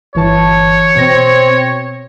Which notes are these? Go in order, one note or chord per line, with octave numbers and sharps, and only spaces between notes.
G1 E3 C#5 A5
B2 C4 A#6